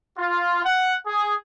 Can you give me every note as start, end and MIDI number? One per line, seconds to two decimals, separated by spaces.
0.17 0.62 65
0.65 0.93 78
1.06 1.35 68